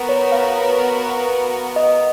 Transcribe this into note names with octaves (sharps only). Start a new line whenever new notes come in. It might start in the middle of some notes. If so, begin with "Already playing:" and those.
Already playing: B3 F#4 A#4
C#5
F5
D#5